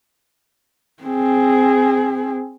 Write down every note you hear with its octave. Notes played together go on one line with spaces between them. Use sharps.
C4 G#4